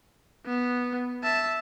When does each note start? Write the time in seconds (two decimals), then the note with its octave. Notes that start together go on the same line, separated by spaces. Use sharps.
0.46 B3
1.23 E5 A5